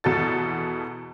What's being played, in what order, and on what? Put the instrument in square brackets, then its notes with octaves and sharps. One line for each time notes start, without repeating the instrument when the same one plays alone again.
[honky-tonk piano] E2 B2 F#4 A4 A6